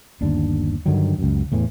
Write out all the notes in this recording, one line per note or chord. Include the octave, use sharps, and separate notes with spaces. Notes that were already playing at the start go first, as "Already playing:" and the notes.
G1 D#2 D4
G2 D3 D#3 F#3
C#2 F#2
E2 A2 E3